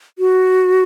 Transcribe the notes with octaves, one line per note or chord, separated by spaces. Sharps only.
F#4